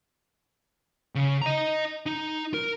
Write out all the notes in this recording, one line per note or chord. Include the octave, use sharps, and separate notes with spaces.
C#3
D#5 A#5
D#4
A#4